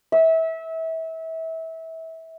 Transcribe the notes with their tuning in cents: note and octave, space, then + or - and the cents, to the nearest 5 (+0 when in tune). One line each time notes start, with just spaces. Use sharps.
E5 -25